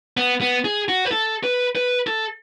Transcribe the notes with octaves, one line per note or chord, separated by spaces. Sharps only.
B3
B3
G#4
F#4
B4
A4
B4
B4
A4